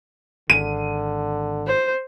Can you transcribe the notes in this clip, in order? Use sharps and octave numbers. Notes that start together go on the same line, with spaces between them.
G#1 D3 D#7
C5